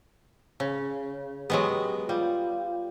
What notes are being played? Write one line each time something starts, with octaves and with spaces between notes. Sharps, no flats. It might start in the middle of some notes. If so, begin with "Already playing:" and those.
C#3
F#3 G#3 B3 G4
G3 F4